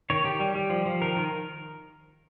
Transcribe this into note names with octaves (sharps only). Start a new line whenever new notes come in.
D#3 C#5
D#3 G4
G3
G3
F3
F3
D#3 A#4
D#3